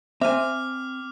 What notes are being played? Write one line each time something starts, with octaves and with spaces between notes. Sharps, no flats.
C4 E5 G#5 D6 F6